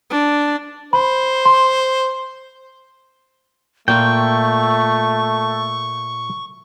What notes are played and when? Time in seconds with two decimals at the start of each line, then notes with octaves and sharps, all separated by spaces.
0.10 D4
0.93 C5 B5
1.45 C6
3.88 A#2 A3 A#3 F4 G5 C#6